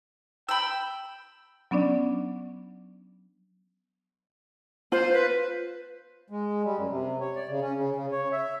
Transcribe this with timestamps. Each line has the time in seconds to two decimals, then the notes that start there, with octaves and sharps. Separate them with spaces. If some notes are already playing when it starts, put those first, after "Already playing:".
0.49 G5 B5 E6
1.71 F#3 B3 C#4 D4 D5
4.92 F4 C5
5.13 B4
6.30 G#3
6.63 G3
6.77 F#2
6.89 C3
7.20 C#5
7.35 D5
7.49 C#3
7.61 C#4
7.76 C#3
7.96 C#3
8.12 C#5
8.32 E5